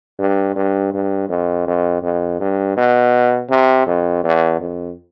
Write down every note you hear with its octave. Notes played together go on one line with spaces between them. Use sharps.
G2
G2
G2
F2
F2
F2
G2
B2
C3
F2
E2
F2